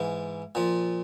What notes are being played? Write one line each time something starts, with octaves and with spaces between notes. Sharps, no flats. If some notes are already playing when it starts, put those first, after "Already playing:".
Already playing: G#2 E3
A#2 F3